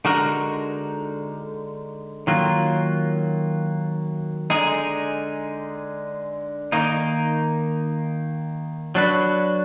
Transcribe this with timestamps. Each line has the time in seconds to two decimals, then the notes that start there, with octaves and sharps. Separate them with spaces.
0.05 D3 G#3 D#4 F#4 A#4
2.27 D#3 F#3 A#3 F4
4.50 D3 G#3 D#4 G#4
6.72 D#3 A#3 D#4
8.95 F#3 D4 F#4 B4